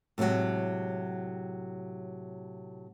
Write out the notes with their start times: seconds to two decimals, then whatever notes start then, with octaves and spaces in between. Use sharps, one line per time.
0.18 A2 C3 F3 F#3 G#3